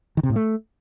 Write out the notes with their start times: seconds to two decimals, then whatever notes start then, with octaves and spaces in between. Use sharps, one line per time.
0.17 D#3
0.23 C3
0.30 A2
0.36 A3